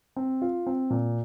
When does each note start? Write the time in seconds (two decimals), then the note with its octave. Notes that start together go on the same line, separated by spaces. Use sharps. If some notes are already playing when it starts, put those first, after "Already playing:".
0.16 C4
0.42 F4
0.67 C4
0.90 A#2